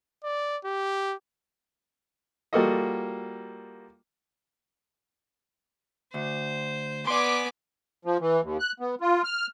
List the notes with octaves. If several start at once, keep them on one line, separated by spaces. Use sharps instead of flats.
D5
G4
G3 A#3 F4 F#4 A4 D#5
D2 C5
B3 D5 G#5 C6 D6
F3
E3
D#2
F#6
B3
F4
F6